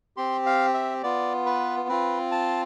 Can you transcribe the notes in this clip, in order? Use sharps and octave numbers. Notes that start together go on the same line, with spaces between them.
C4 G4 C6
F5
E5
B3 F4 D5
B4
C4 F4 B4
A5